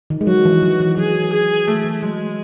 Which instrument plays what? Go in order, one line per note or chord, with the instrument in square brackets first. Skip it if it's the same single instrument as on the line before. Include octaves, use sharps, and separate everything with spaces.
[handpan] D#3
G#3
[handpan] F#3 [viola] F#4
[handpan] E3
F#3
E3
[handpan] F#3 [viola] G#4
[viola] G#4
[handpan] E3 [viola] A3
[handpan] E3
[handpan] F#3 [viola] G#3